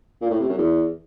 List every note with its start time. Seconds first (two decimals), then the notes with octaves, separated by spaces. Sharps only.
0.21 A#2
0.30 A2
0.40 C3
0.49 F#2
0.58 E2